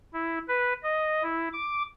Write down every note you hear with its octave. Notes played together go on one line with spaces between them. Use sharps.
E4
B4
D#5
E4
D6